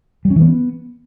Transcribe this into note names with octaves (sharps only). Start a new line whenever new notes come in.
G3
C#4
E3
B3